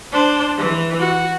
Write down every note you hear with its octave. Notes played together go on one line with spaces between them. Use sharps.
D4 C5
E3
F#4